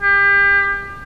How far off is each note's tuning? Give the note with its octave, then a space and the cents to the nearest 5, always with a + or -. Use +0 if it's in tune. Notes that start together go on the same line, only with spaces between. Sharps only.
G4 +30